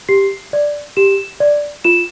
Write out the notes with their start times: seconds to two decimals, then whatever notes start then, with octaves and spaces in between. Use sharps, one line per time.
0.09 G4 C7
0.53 D5
0.97 G4 E7
1.40 D5
1.84 F4 E7